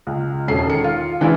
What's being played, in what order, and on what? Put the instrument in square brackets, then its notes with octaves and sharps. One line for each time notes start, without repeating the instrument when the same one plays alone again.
[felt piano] C#2
E1 C#4 A4 C7
D#3 C#7
F4
D3 E3 G#3 D4 E4 F4